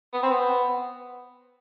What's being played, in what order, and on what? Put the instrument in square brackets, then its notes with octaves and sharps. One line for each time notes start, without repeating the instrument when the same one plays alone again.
[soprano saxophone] B3
C4
B3